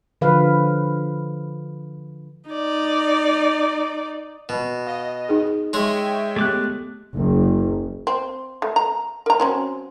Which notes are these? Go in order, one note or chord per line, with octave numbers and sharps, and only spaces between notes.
D3 F3 B4 F5
D#4 D5
B2
D#5 F5
D#4 G#4
G#3 G#4 C#5 E5 G5 C6
A3 B3 G4 D6 F#6
F#1
C4
A3
A#5
A#4 A#5
F#3 C4 C#4